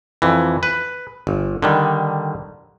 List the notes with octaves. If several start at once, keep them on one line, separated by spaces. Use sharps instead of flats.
F2 E3
B4
G1
D3 D#3 G3